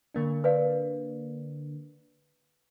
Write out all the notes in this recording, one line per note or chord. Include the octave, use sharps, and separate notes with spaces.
D3 A#3 D4
B4 D5 F5